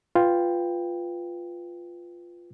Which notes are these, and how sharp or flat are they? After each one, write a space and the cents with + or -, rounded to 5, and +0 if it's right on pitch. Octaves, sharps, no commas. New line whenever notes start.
F4 +0 B4 +5 G5 +10